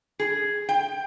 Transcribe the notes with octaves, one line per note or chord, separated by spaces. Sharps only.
G#4
G5